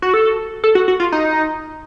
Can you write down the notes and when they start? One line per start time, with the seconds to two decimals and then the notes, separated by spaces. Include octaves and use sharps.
0.02 F#4
0.14 A4
0.64 A4
0.75 F#4
0.88 F#4
1.00 F4
1.12 D#4